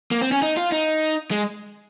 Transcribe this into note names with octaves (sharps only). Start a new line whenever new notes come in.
A#3
C4
C#4
D#4
F4
D#4
G#3